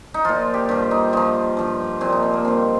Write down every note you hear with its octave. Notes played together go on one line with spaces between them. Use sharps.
D#4
A#2 F3 F4
G4
G2 F3
D#4
G2 F3 D#4
G2 F3
A#2 F3 C4
D#4
C4
A#3
G2 F3 C4